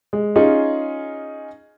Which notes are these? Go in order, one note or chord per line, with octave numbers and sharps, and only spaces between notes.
G#3
C#4 D#4 F4 G#4